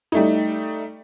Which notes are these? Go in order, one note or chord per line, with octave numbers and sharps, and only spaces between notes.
G3 A3 D#4